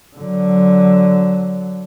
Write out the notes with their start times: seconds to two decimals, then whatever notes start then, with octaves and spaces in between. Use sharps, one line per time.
0.17 D3 F#3